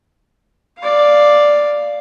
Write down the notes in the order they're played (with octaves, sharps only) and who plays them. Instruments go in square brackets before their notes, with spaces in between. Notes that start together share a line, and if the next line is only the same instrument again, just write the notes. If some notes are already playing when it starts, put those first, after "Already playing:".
[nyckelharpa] D5 F5